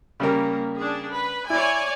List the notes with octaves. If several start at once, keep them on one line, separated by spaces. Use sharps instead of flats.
C#3 G3 A#3 A#4
D4 G#4
B4
E4 C#5 D5 G#5